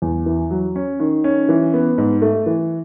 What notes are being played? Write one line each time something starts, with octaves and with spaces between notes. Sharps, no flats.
E2
E3
F#3
C#4
D#3
C#4
E3
B3
G#2
A3
E3